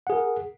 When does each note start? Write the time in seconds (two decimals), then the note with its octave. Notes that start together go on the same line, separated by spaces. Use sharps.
0.07 F#5
0.10 G#4
0.13 A#4